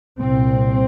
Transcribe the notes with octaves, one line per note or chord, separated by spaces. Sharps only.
C2 A#2 C4